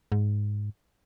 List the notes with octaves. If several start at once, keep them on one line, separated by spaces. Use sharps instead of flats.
G#2